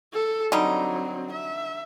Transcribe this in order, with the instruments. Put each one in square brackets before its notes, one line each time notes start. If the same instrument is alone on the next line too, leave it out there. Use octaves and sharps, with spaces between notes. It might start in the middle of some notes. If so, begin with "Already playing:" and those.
[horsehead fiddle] A4
[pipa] D3 G3 D#4 [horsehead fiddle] F#3 C4
[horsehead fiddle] E5